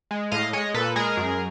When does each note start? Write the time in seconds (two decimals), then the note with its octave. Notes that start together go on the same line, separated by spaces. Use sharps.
0.11 G#3
0.31 A2 D#5 F5
0.53 G#3 C#5 D#5
0.74 A#2 A4 B4
0.96 G#3 G#4 A#4
1.17 F#2